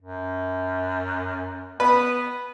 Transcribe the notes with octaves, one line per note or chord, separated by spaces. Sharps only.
F#2
B3 B4